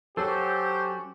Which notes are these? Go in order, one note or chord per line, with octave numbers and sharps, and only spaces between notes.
F#3 C#4 F#4 G4 A4 C5